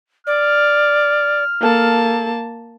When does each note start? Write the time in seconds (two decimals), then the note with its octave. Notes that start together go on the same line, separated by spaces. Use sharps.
0.27 D5 F6
1.61 A#3 A4 A5